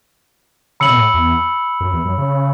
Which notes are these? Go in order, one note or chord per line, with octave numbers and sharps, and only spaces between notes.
C#3 B5 E6 C#7 F#7
B2
A2
E2
F#2
E2
F#2
C#3